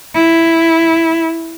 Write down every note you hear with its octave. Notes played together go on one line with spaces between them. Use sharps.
E4